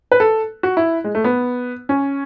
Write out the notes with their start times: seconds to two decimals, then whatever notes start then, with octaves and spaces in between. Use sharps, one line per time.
0.12 B4
0.20 A4
0.63 F#4
0.77 E4
1.04 G#3
1.15 A3
1.24 B3
1.89 C#4